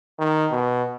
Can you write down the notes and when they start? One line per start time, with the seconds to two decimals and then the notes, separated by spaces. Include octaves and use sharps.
0.19 D#3
0.51 B2